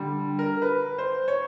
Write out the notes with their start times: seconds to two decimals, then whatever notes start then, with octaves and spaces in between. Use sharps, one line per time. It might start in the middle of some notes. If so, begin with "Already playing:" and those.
Already playing: D3 G3
0.39 A#4
0.62 B4
0.98 C5
1.28 C#5